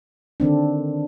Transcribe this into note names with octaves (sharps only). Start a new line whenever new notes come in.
D3 D#3 C4 D4